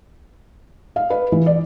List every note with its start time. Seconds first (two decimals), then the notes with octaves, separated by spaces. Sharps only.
0.96 F5
1.10 B4
1.32 E3
1.46 D5